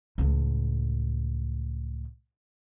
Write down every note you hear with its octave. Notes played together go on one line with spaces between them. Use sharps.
C#2 A2